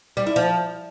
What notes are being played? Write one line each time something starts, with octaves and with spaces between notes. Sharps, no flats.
G3
E4
F3